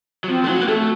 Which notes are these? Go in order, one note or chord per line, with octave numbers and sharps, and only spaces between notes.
F#3
F3 C4
A3
F#3 F#4
A#3
A3 A4